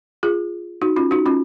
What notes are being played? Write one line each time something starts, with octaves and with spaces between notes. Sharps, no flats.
F4 G#4
D#4 F#4
C#4 F4
D#4 F#4
C#4 F4